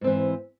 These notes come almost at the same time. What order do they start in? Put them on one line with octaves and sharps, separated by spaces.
G#2 C4 E3